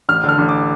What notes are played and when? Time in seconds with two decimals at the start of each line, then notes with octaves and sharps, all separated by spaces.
0.09 A1 F6
0.24 D3 F6
0.38 A1
0.49 D6